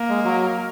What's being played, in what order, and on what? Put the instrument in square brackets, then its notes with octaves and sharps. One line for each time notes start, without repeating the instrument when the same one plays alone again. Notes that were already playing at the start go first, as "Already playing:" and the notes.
Already playing: [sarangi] A#3
[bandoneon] G#3
F#3